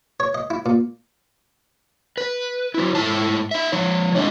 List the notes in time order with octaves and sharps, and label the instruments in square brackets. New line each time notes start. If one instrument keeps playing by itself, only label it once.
[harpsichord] C#5
D#5
E4
A#2
[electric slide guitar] B4
F#3 E4
G#2 B2 A3 E4 A5
D#4 E5
F3 C#5
G#3 D4 E4 F4 D#5